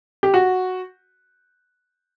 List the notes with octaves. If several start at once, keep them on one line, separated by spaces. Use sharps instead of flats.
G4
F#4